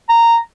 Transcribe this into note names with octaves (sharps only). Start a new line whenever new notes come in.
A#5